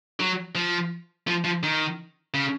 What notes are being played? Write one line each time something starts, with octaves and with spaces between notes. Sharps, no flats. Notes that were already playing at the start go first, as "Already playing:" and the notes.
F#3
F3
F3
F3
D#3
C#3